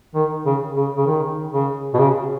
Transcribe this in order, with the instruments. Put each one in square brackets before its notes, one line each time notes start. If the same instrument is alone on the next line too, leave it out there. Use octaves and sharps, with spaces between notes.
[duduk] D#3
C#3
C#3
C#3
D#3
C#3
B2
C#3